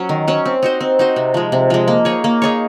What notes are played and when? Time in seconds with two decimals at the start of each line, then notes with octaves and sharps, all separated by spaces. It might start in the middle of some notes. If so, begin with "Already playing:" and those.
Already playing: F#3 C#4
0.09 D#3
0.28 F#3 C#4
0.45 C4
0.63 D#4 F#4 C5
0.81 C4
0.99 D#4 F#4 C5
1.16 C3
1.34 F3 G#3
1.52 C3
1.70 F3 G#3
1.88 A#3
2.05 D#4 G#4 C#5
2.24 A#3
2.42 D#4 G#4 C#5